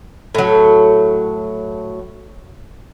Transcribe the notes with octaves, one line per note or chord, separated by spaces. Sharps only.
A2 F#3